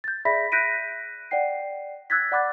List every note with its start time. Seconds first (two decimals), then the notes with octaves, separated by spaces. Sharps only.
0.04 G6 A6
0.25 G#4 D5 E5 B5 A#6 B6
0.52 F#6 G6 A#6 B6 D7 D#7
1.31 D5 F#5 G5 C7
2.10 E6 F#6 G#6 A6 B6
2.32 D5 F#5 B5 D6 F#6 A6